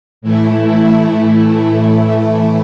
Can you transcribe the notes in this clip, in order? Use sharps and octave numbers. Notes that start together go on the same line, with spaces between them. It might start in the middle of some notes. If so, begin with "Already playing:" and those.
A2 E3 A3 E4